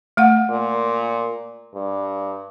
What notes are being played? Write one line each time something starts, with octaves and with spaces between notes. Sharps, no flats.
A3 F5 F#5
A#2
G2